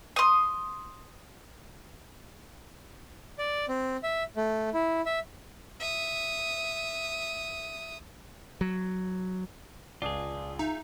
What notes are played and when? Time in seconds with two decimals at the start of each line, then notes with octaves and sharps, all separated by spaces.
0.16 C6 D#6
3.38 D5
3.69 C4
4.03 E5
4.37 A3
4.74 E4
5.06 E5
5.80 E5 D#6
8.61 F#3
10.02 C#2 F4 G#4 D5 A5 D#6
10.59 D#4 E5